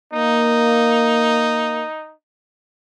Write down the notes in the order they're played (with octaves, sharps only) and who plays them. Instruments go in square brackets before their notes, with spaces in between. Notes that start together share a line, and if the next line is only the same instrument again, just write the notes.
[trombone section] A#3 [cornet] D#4